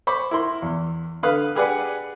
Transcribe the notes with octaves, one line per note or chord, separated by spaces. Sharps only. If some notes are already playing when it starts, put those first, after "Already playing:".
C5 B5 C#6 D6
E4 A#4 C6
E2
D3 B4 F5 D#6 F#6
G4 G#4 B4 D5 F#5